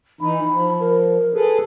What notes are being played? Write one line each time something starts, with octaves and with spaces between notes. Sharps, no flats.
E3 D#4 B5
F3
A#4
G#4 A4 B4